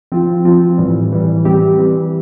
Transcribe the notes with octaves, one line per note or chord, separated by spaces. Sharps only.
F3 C4 F4
F3 C4 F4
A2 E3 G3
A2 E3 G3
E3 G3 C4 G4
E3 G3 C4 G4